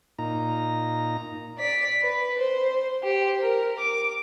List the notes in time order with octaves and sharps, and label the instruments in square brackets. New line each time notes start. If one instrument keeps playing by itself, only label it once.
[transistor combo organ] A#2 D#4 A#5
[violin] D5 B6
B4
C5
G4 C5
A#4
D6